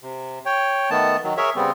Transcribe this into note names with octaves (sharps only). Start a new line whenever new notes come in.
C3
C#5 G5
D#3 A3 B3 A5
D#3 F#3
G#4 A#4 C#5 E5
C#3 G3 B3 C4